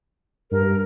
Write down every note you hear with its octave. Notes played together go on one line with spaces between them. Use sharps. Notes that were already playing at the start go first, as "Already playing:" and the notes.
G2 A#4